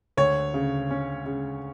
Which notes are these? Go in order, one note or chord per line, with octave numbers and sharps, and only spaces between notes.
D2 C#5
C#3
C#4
C#3